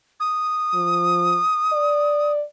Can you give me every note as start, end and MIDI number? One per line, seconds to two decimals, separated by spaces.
0.20 2.32 87
0.74 1.40 53
1.72 2.44 74